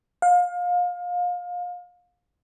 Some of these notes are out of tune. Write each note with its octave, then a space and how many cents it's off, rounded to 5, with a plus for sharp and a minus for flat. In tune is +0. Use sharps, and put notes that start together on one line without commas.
F5 +30